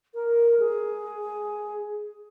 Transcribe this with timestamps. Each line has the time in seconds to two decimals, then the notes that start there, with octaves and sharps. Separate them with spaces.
0.14 A#4
0.59 G#4